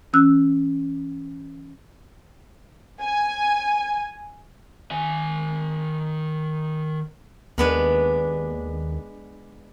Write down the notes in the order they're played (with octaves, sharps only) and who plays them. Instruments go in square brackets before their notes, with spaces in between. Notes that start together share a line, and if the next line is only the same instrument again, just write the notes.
[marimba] E3 C#4 E6 F#6
[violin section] G#5
[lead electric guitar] D#3 G#5
[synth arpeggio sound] D#2 [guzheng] G#3 B3 D4